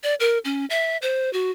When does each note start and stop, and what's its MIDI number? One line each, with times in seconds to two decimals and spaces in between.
0.03 0.15 74
0.20 0.38 70
0.45 0.65 61
0.70 0.97 76
1.02 1.32 72
1.33 1.51 66